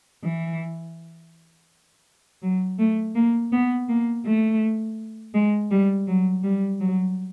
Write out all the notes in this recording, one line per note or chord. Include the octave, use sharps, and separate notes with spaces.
E3
F#3
A3
A#3
B3
A#3
A3
G#3
G3
F#3
G3
F#3